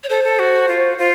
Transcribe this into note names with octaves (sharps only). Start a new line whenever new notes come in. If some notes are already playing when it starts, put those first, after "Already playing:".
C#5
A4 C5
A4
F#4
F4
F4